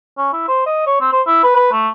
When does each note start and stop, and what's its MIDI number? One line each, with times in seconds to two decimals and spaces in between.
0.18 0.33 61
0.33 0.46 64
0.48 0.63 72
0.66 0.85 75
0.87 0.97 73
1.01 1.09 60
1.13 1.22 72
1.27 1.41 64
1.44 1.54 71
1.56 1.68 71
1.72 1.88 57